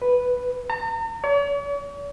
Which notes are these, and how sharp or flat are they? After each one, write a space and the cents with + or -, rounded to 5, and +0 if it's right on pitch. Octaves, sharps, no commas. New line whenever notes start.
B4 +0
A#5 -40
C#5 +45